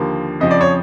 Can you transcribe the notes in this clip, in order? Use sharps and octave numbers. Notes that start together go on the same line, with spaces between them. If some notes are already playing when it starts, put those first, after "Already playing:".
Already playing: D#2 D3 F3 A#3
F2 C#3 F3 D#5
D5
C#5